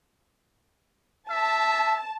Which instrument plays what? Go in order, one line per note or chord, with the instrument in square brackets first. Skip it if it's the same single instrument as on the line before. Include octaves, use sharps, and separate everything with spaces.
[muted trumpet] E5 [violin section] A5